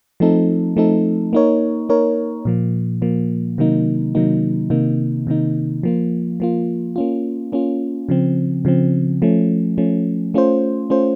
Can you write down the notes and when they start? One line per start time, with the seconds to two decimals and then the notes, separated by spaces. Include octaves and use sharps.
0.20 F3 A3 C4 D#4 A4
0.77 F3 A3 C4 D#4 A4
1.33 A#3 D#4 A#4 C#5
1.89 A#3 D#4 A#4 C#5
2.45 A#2 F3 A#3
3.02 A#2 F3 A#3
3.58 C3 D#3 F#3 A#3 D#4
4.15 C3 D#3 F#3 A#3 D#4
4.70 C3 D#3 A#3 D#4
5.27 C3 D#3 A#3 D#4
5.83 F3 A#3 F4
6.40 F3 A#3 F4
6.96 A#3 C#4 F4
7.52 A#3 C#4 F4
8.09 C#3 F3 C4
8.65 C#3 F3 C4
9.22 F3 A3 C#4
9.78 F3 A3 C#4
10.34 A3 C#4 F4 C5
10.90 A3 C#4 F4 C5